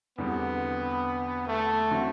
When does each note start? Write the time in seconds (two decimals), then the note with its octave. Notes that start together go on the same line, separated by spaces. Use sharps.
0.18 E2 D3 G3 B3 C4
1.47 A3
1.90 D3 F#3 C4 F#4